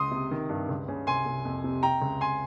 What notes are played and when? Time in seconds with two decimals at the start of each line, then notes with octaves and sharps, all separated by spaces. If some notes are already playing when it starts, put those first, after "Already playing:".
Already playing: C#2 C6 D#6
0.11 C3
0.31 D#3
0.49 G2
0.69 C#2
0.88 C#3
1.07 C2 G#5 C6
1.26 C2
1.45 F2
1.64 C3
1.83 C3 G5 A#5
2.02 C#2
2.21 G#5 C6